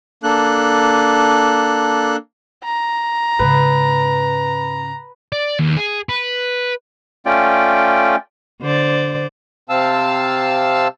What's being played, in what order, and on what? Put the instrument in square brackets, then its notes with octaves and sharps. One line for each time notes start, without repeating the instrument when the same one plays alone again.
[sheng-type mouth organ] A#3 D4 A4 F#6
[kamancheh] A#5
[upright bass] G#2 C#3 [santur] B4
[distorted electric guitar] D5
D#2
G#4
B4
[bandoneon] A3 C#4 F4 D5 G5
[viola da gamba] D3 C5 D5
[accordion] C3 C4 F5 A5 E6